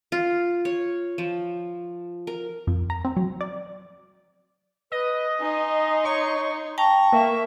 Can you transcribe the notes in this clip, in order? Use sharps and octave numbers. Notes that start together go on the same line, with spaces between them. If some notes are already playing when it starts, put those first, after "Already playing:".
F4
C#5
F3
A#4
F2
A#5
C4
F#3
D5
B4 D#5
D#4 G#5 C6
C#5 C#6
G5 A5 A#5 C#6
A#3 E5